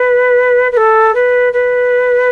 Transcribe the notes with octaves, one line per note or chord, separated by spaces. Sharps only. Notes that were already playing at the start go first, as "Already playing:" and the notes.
Already playing: B4
B4
A4
B4
B4